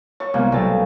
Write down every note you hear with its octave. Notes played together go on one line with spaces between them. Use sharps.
C#5 C#6
C2 G#3 A#3 B3
B1 A3 A6